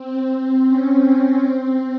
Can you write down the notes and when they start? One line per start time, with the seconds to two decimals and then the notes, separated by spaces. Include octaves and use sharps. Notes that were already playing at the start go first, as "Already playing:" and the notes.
Already playing: C4
0.67 C#4
1.06 C#4
1.45 C4